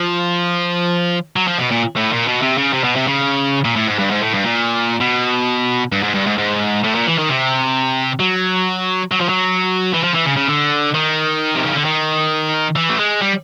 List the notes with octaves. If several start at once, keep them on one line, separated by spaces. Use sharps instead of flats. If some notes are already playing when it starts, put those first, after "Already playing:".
Already playing: F3
F#3
F3
B2
A#2
A2
A#2
B2
C3
C#3
C3
B2
C3
C#3
A#2
A2
G#2
G2
G#2
A2
G2
A#2
B2
G2
G#2
G2
G#2
G#2
A2
A#2
E3
D#3
C3
F#3
F#3
F3
F#3
E3
F3
E3
C#3
C#3
D3
D#3
C3
C#3
D3
D#3
E3
A3
G#3
G3